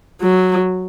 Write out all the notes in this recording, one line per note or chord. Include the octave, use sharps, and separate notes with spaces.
F#3